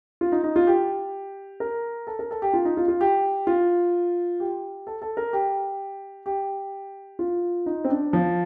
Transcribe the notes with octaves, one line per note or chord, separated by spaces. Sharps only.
F4
D#4
D#4
F4
G4
A#4
A4
A#4
A4
G4
F4
D#4
F4
F4
G4
F4
G4
A4
A4
A#4
G4
G4
F4
D#4
C4
D4
F3